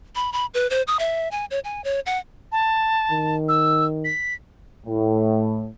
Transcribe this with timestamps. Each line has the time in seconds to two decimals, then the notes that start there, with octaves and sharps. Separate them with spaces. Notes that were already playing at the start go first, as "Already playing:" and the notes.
0.15 B5
0.33 B5
0.54 B4
0.70 C5
0.87 D#6
0.99 E5
1.31 G#5
1.51 C#5
1.64 G#5
1.84 C#5
2.06 F#5
2.52 A5
3.11 D#3
3.49 E6
4.05 B6
4.86 A2